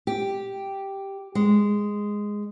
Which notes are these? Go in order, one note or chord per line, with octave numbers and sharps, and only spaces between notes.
G4
G#3